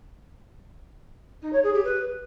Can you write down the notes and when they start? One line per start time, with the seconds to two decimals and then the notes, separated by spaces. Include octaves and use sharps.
1.42 D#4
1.53 C#5
1.63 G#4
1.74 G4
1.84 B4